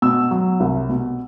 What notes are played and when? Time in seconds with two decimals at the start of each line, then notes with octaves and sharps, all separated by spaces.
0.02 B2 E6
0.31 F#3
0.60 C2
0.89 B2